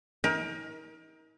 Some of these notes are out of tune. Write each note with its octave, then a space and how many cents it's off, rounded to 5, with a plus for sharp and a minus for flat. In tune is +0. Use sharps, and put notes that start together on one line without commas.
D#4 +40 A#4 +25